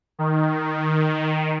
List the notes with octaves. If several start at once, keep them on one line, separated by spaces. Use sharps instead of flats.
D#3